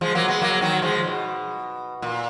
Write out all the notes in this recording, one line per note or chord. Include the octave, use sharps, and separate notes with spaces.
F3 G#3
F#3 A#3
G#3 B3
F#3 A#3
D#3 F#3
F3 G#3
B2
A#2